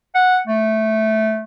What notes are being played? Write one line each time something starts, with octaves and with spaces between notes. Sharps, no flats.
F#5
A3